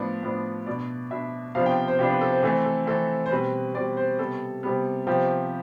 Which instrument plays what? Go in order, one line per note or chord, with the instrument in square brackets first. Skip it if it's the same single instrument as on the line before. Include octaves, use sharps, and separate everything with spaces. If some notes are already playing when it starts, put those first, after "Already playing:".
Already playing: [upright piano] A2 F3 B3 D4 D5
A2 F3 B3 D4
B2 B3 D4 D5
B2 B3 D4 E5
C3 F3 B3 D4 F5
G5
C5
C3 F3 B3 D4 G4
B4
A4
C5
E3 A3 C4 A4
A4
E3 A3 C4 A4
C5
B2 G3 C4 B4
B2 G3 C4 D5
C5
C3 G3 B3 A4
C3 G3 B3
C3 F3 B3 G4